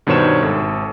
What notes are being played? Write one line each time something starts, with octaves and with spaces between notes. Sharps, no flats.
G2 B2 D#3 C5 C#5 E7
G#1 A4